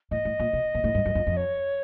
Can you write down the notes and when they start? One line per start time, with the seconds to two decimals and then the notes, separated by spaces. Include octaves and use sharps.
0.11 A2 D#5
0.25 A2
0.39 A#2
0.53 B2
0.75 A#2
0.84 A2
0.95 G2
1.06 F#2
1.15 F2
1.27 F2
1.37 C#5